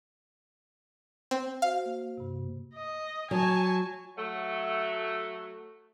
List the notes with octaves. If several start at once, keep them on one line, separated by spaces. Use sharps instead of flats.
C4
F#4 C5 F5
A#3
G2 C3
D#5
F#3 G#5 A5 C#6
F#3 A3